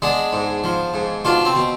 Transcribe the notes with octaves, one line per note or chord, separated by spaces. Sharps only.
G#3 B3 D4
G#2
F3
G#2
B2 D4 F4
C4
B2